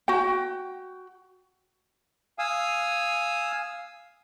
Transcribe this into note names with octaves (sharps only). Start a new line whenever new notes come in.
F#4 G5
F5 G#5 D#6 E6